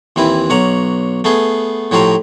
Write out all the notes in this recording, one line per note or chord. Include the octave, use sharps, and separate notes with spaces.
D#2 E3 C4 E4 B4
B1 C#5 F#5 A#5
A3 B3 G#4 C6
A2 F3 F#4 G4 C5 A#5